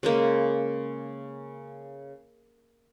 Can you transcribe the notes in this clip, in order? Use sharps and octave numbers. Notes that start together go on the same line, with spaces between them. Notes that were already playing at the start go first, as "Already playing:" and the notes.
C#3 G#3 A#3